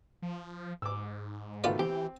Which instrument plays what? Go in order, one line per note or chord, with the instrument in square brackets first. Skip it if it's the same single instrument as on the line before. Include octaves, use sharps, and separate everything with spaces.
[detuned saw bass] F3
[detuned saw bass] G#2 [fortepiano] D6 E6
[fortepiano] B2 D#3 A3 [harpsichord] B3 F4 D5
[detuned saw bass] E3 [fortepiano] C4 [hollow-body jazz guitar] G4